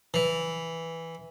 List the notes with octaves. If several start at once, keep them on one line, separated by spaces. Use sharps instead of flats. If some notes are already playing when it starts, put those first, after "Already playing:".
E3